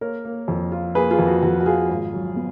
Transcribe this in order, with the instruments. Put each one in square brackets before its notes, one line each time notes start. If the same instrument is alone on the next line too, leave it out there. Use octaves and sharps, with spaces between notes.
[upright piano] A#3 A#4 C#5
A#3
F2
F4
A#3 G#4 B4
F4 G#4
F2
F#4
F2 F#4
F#4
F4 G#4
G#1
F#3
B3